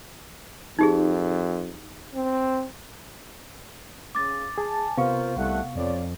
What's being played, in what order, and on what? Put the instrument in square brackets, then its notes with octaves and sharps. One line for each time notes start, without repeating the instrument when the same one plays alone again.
[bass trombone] F2 [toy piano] D#4 G4 G#4
[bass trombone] C4
[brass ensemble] C#3 [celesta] D6 A6
[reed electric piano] G#4 [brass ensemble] G#5 A5
[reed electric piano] C3 B3 C#6 [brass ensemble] F4 A#4 C5 [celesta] F5
[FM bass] C2 [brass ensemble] A3 F#5
[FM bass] F2 [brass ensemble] F4 C#5 D5